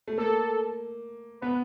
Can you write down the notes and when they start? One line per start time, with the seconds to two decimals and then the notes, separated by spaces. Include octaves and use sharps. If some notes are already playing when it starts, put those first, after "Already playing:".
0.08 A3
0.18 A#3 A4
1.41 B3 B4